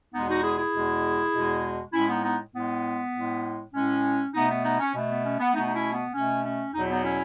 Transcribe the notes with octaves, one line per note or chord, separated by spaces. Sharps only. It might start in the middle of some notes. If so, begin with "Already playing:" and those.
E2 B2 G#3 B3 D#4
D#4 F#4
E4 G#4
E4 G#4
E2 B2 G#3
E2 B2 G#3
A2 G#3 C#4 E4
B3 D#4
B3 D#4
A2 G#3 B3
A2 G#3
A2 G#3 C#4
B2 A3 B3 D#4
B3
B3 D#4
C#4
B2 A3
B3
C#4
B3
B2 A3 B3 D#4
D#4
C#4 E4
B3
B2 A3 C#4
C#4
E2 B2 F#3 D#4
E4
B3 D#4
C#4 E4